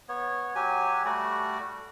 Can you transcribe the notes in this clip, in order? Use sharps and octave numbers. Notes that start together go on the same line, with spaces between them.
B3 C#5
F#3 G4 G#5
G3 A3 F#4 D5